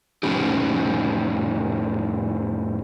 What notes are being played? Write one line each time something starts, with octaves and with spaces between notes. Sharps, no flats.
F2 A2 C#4 D#4 G4